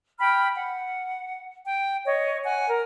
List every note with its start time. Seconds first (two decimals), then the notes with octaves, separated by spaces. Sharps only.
0.19 G5 B5 F6
0.53 F#5
1.64 G5
2.05 C#5 D#5
2.44 F#5 G#5
2.68 A#4